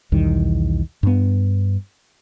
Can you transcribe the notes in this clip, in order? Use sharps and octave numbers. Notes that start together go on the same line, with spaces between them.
B1 E2 D#3 G3
G2 B3